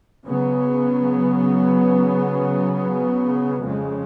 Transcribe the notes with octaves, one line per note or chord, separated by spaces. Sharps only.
C#3 F#3 B3
F2 C#3 G#3